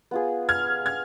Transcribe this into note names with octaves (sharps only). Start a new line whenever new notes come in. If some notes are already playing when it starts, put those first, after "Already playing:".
B3 F4 G#4
F6 G#6
F6 G#6